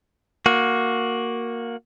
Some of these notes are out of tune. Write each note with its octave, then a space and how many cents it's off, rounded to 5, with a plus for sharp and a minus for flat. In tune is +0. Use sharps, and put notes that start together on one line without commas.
A#3 +0 F#4 -10